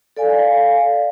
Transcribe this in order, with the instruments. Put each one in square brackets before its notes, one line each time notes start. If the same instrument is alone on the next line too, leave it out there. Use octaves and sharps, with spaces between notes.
[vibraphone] A4 D5 F5 G#5